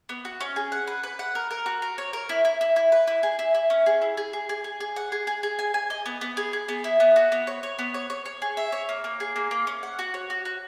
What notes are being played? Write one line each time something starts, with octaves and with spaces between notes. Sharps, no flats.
B3
F#4
C#4
G#4
F#5
B4
B4
F#5
A#4
A#4
F#4
A#4
C#5
A#4
E4
E4
E4
E4
B4
E4
G#4
E4
E4
C#4
G#4
E4
G#4
G#4
G#4
G#4
G#4
F#5
G#4
G#4
G#4
G#5
G#5
D#5
B3
B3
G#4
G#4
B3
E4
B3
F#4
B3
C#5
C#5
B3
C#5
C#5
C#5
G#4
E5
C#5
A#3
A#3
G#4
A#3
A#3
C#4
F#5
F#4
C#5
F#4
F#4